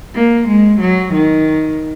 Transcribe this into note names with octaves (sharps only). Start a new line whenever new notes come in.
A#3
G#3
F#3
D#3